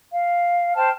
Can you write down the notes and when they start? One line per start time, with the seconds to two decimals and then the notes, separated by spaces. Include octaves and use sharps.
0.11 F5
0.74 C5 G5 A5 F6